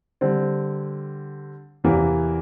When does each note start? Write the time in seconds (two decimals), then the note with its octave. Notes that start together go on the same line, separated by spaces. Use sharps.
0.21 D3 G3 C4
1.84 E2 C3 E3 A#3